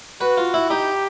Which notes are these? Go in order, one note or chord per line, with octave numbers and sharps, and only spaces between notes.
F#4 B4
F4
E4
D#4 G4